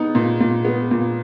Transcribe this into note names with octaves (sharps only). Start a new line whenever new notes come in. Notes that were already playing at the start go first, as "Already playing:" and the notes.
Already playing: B3 D#4
A#2
A#2
B3
A#2